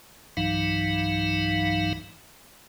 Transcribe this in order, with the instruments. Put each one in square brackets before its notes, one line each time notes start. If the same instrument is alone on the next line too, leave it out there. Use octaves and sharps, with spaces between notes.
[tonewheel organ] B1 G2 E3 F#3 D#4 F5